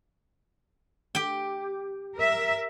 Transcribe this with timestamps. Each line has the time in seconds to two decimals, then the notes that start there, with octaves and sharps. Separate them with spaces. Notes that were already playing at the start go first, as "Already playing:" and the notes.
1.15 G4 G5
2.16 A#4 E5